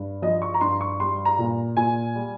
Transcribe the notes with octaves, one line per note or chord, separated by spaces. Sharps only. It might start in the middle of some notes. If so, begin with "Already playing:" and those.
Already playing: G2
F3 D#5
C#6
A#5
G2 C6
C#6
G3 C6
A#5
A#2
A#2 G#5
G3